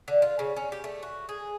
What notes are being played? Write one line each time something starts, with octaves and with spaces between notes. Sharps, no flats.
D3
F4
C#3
C#4
G4
A3
F#4
G#4